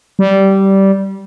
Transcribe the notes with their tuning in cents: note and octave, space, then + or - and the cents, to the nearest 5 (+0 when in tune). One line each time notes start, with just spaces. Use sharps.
G3 -15